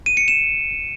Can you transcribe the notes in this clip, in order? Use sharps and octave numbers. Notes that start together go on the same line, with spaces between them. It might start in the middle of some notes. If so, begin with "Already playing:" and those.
D#7
C#7
E7